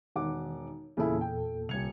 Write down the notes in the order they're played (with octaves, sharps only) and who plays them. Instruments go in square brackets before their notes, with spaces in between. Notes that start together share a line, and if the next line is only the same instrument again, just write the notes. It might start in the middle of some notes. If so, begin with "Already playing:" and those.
[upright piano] E1 F#5 D6 [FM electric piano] D#3
[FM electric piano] E2 A#2 A4 [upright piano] C#3 E4
[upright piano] G5
[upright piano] D#1 G#6 F7 [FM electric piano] C2 C#7